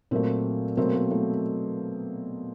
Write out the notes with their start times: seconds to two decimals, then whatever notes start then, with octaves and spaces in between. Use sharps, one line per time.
0.11 A#2 F#3 A3 A#3 C4
0.77 B2 F#3 A3 A#3 C4
0.94 A#3
1.11 A3